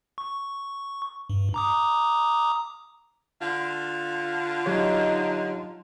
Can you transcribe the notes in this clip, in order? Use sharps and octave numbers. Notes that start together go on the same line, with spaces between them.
C#6
G2
A#5 D6 D#6
D3 F4
F#3 D#4 G4 C#5